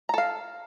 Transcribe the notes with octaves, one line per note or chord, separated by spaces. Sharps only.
A4 F5 A#5